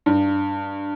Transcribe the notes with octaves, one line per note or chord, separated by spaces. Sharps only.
G2